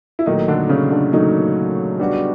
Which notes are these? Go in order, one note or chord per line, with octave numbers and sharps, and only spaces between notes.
E4
A#2 D#3 F#3 A3 D#4
D3 D4
C#3 C#4
D3 D4
A#2 D#3 F#3 A3 D#4
G3 B3 D4 F#4